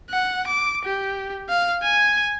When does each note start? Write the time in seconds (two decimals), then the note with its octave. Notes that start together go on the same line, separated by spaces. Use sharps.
0.10 F#5
0.47 D6
0.85 G4
1.49 F5
1.83 G#5